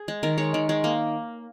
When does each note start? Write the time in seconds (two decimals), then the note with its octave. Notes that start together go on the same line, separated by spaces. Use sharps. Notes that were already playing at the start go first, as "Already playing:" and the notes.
Already playing: G#4
0.08 G#3
0.23 D#3 A#4
0.38 G#3 C#5
0.54 D#3
0.69 G#3
0.84 A#3